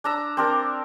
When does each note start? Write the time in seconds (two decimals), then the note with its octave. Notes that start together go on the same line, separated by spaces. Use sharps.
0.04 D4 A#5 E6
0.37 C4 D4 A#4